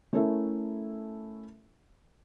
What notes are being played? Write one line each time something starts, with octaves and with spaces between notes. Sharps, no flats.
A3 C#4 E4 A4 A#4 E5